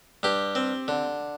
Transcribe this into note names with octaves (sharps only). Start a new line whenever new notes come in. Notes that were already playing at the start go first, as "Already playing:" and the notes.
G2 G4
C4
D3